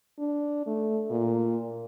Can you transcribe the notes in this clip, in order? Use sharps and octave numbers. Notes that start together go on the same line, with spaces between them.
D4
A3
A#2